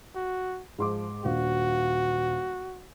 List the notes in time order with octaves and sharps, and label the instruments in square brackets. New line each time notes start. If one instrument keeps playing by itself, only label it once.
[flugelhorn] F#4
[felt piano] G#2 C6 D6 [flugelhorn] F3
[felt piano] D#1 D4 F5 [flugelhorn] F#4